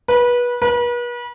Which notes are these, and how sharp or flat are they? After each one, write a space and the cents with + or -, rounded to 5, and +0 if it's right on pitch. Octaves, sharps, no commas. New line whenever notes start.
B4 -25
B4 -40